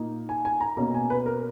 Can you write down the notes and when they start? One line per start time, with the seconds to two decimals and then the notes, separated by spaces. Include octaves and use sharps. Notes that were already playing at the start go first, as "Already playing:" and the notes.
Already playing: A#2 A#3 D#4
0.29 G#5
0.45 G#5
0.61 A#5
0.77 B2 A#3 C#4 A#5
0.94 G#5
1.10 B4
1.26 A#4